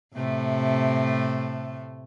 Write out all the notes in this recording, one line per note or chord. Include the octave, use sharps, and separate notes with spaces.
A2 C3 A3